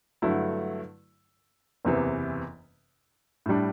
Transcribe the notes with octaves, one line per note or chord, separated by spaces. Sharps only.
G2 D3 F#3 A3 E4
F#1 E2 C3 E3
A2 G3 D4